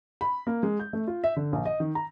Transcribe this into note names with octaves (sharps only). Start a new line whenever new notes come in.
B5
A#3
G#3
G6
A3
F4
E5
D3
A#1
D#5
D#3
A#5